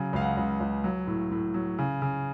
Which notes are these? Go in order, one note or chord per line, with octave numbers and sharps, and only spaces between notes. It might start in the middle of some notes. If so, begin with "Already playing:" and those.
Already playing: C#3 F#3
C#2 F5
F#5
C#2
C#2
F#3
A2
A2
F#3
C#3
C#3